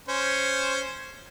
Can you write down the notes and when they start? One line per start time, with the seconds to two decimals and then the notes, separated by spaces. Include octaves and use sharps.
0.08 C#4 C5